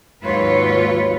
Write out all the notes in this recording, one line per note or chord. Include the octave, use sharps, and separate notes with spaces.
D#2 G#2 F#3 F4 B4 C#5